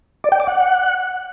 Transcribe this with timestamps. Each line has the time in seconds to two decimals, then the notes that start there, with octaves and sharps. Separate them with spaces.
0.24 D5
0.32 G5
0.40 D6
0.47 F#5